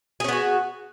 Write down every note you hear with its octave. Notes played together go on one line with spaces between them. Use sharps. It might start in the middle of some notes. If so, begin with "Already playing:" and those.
B3 C#4 F#4 G#4